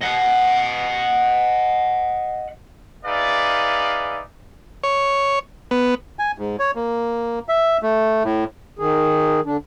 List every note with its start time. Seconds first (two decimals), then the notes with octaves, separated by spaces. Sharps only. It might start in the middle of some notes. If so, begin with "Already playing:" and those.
0.01 D#5 F#5
3.05 D#4 G#4 B4 D5 E5 F5
4.84 C#5
5.71 B3
6.19 G#5
6.38 G#2
6.59 C#5
6.75 A#3
7.49 E5
7.82 A3
8.24 A2
8.79 D#3 G#4
9.45 D3 D4